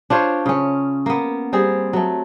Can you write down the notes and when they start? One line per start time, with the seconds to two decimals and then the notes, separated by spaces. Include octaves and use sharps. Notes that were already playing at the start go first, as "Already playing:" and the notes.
0.10 D4 F4 C5 C#5
0.46 C#3 C#4
1.06 A#3 B3
1.53 G3 C4 G#4
1.93 F#3 A3